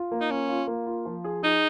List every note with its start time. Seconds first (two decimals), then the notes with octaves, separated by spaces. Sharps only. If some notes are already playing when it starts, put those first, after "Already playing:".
Already playing: F4
0.12 A#3
0.21 D#4
0.30 C#4 F4
0.49 F4
0.67 A#3
0.87 F4
1.05 F3
1.24 G#4
1.43 D#4 G#4